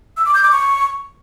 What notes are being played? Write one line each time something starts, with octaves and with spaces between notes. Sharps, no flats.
E6
D6
G6
D6
C#6